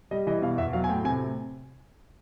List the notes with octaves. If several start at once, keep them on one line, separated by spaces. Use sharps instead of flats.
G3 D#5
E3 D#5
B2 F5
E2 E5
F#3 F5
G#5
A2 G5
C3 G#5